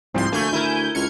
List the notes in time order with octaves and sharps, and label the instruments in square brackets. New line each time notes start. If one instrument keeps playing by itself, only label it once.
[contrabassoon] C2 [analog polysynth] G#2 F3 C6 [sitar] C4
[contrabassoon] D2 [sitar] A3 A#3 [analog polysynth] G#5 G6
[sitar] E4 A#4
[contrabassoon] C#2 [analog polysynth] F6 G#6 C#7